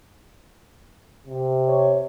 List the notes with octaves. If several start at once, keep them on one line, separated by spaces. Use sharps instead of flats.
C3
C#5